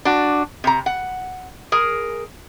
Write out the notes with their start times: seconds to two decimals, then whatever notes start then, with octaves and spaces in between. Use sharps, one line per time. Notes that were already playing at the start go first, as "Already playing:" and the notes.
0.05 D4 F#4
0.64 C3 A#5
0.86 F#5
1.72 G#4 A#4